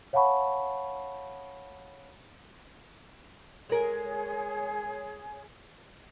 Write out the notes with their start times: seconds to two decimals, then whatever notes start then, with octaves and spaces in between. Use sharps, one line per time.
0.13 C#5 F5 F#5 A5 B5 C#6
3.69 G#3 G#4 A#4 C#5